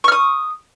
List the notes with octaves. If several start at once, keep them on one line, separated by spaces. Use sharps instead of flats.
C#6 D#6 F6